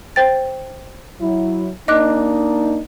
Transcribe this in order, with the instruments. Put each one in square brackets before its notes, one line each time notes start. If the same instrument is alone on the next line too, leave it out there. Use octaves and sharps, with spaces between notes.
[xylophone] C5 G5 A6
[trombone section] F#3 E4
[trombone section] A#3 D4 D#4 [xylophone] D#5 D6 F#6